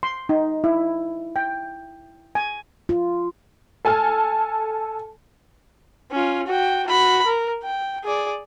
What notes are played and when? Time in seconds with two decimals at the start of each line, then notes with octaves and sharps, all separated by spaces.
0.03 C6
0.29 D#4
0.64 E4
1.36 G5
2.35 G#5
2.89 F4
3.85 A4 G#5 A5 F6
6.12 C#4 F4
6.47 F#4 G5
6.87 F#4 B5
7.26 A#4
7.64 G5
8.04 G#4 D5